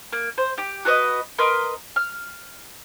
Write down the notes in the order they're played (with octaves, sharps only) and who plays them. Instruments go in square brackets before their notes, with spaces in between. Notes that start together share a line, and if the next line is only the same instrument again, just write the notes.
[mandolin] A#3
C5
G4 D6
F#4 A4 B4 D#5
A#4 B4 D#5 C6
F6